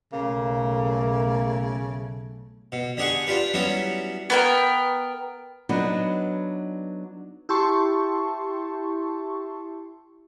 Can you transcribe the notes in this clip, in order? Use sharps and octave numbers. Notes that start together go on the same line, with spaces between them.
B1 C#3 A3 A#3
B2
D3 G4 G#4 F#5 C#6
D4 F4 G4 B4
F#3 G3 B3 C#4 E4 F#4
B3 A#4 G5
F#3 B3 D4 D#4
E4 G4 A5 C6 C#6